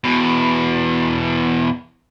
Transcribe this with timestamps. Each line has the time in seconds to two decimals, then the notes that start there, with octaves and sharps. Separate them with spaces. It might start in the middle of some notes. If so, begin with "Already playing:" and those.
0.04 E2 B2